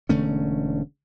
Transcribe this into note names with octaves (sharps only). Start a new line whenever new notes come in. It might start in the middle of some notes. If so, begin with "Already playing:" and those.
E1 D3 A3 C#4